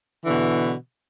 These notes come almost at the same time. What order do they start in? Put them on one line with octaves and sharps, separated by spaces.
E3 D3 B2